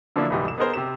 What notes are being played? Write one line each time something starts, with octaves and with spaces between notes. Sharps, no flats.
D3 F3 F#3 A#3 D4 E4
C2 G#2 E3 G3 D#4
E1 E7
B3 D#4 G#4 A#4 C5
C3 G4 E7